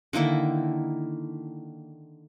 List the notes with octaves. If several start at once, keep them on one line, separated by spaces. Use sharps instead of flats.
D3 D#3 A#3 E4